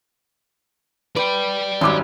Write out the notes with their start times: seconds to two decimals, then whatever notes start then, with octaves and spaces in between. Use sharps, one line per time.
1.16 B4 D5 G5
1.81 G#1 F#2 F#3 G3 D6